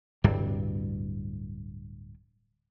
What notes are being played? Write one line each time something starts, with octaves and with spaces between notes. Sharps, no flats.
D1 G2 C3 G3